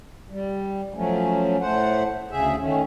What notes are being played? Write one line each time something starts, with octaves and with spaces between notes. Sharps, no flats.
G3
F3 F#3 A3 C#4
A2 A3 C5 F#5
D2 C#3 G#4 E5
D#3 A3 C#4